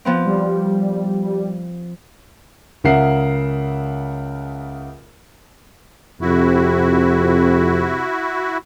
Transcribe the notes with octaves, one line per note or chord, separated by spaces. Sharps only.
F3 B3 C4
G3
C#2 C#3 A#4 E5 F#5 C7
F2 C3 E4 F#4